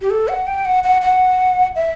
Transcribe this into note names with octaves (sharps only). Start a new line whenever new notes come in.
G4
A4
F#5
G5
F#5
F#5
F#5
E5